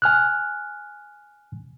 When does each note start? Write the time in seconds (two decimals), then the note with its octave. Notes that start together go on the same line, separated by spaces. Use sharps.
0.02 G#5 F6 F#6